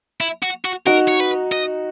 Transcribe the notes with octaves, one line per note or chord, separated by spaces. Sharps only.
E4
F#4
F#4
D#4 F#4 A#4
C#5
B4
D#5